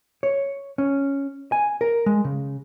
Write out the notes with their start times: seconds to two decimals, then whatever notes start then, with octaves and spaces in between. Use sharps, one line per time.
0.23 C#5
0.78 C#4
1.52 G#5
1.81 A#4
2.06 G#3
2.24 C#3